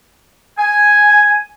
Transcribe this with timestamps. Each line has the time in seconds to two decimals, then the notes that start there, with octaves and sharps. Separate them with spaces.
0.58 G#5